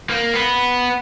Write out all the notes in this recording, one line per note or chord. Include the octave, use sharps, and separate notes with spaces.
A#3
B3